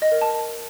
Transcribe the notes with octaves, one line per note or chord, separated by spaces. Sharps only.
D#5
A#4
A5